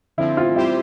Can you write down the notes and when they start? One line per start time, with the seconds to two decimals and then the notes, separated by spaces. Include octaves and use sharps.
0.17 D3 F3 C4 E4
0.37 F4
0.56 G3 C4 E4 G4 C5